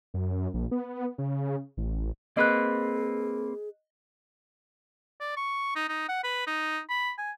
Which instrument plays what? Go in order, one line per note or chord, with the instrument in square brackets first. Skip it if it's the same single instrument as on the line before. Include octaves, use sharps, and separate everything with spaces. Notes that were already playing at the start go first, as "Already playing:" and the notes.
[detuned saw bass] F#2
A#1
B3
C#3
A1
[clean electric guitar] A#3 C4 B4 [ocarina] G#4 [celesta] D#5 F#6
[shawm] D5
C#6
D#4
D#4
F#5
B4
D#4
B5
G#5